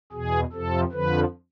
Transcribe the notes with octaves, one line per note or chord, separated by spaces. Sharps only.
E2 B2 G#4
F2 C3 F3 A4
F2 D3 F3 B4